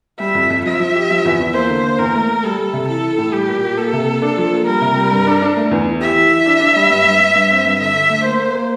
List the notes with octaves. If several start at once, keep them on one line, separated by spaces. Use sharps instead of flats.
G3 E5
F2
F2
F3 E5
F3
G4
F3
E2
E2
A#3 C5
D3
A#3
E2 A#4
A3
A3
G3 A4
G3
C3
E3 A4
E3
A2
G3 G4
A#2
A#2
A#3 A4
C3
A#3
D4
F3
A#3
G3 A#4
C3
G3
G2
D4
D4
A3
E2
E3
G4 E5
E3
E3
D4
D4
G3
G2
G2
G2
G2
C4
G2
D3 E5
D3
A3
A#3 C5
A#3
A#3